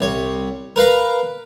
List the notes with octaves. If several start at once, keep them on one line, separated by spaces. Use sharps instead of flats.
C2 C#5
A#4 B4 F5 A#5